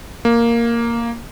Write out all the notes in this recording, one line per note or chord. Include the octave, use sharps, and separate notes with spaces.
A#3